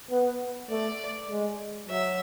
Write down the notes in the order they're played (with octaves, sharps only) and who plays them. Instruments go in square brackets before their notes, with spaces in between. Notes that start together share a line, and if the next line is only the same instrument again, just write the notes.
[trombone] B3
[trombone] A3 [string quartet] D5
[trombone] G#3
[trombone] F#3 [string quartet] E5